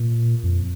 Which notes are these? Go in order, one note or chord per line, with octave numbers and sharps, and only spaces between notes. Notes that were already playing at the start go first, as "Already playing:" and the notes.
Already playing: A#2
F2